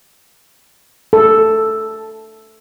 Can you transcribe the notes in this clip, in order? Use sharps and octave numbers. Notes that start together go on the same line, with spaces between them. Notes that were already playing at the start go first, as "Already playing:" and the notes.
A4